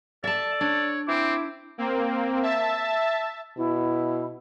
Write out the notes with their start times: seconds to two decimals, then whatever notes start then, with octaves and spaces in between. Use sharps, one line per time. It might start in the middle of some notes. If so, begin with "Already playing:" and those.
0.24 A4 D5 E5 A5
0.61 D4 C#5
1.08 C4 E4 D6
1.78 A#3 C4
2.42 E5 A5 A6
3.57 B2 E4